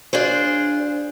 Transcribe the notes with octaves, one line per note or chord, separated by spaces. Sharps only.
D4 F4 G#4 C5